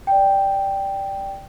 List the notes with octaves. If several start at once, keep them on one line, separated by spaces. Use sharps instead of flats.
D5 G5